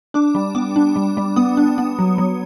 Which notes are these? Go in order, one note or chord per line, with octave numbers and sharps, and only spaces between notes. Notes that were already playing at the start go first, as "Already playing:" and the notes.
D4 D6
G3
B3 D6
D4
G3
G3
B3 D#6
D4
B3
F#3
F#3